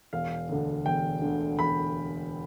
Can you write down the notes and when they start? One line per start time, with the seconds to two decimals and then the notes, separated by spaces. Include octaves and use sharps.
0.13 E1 F5
0.49 D2 D3
0.85 E1 G5
1.22 D2 D3
1.58 E1 B5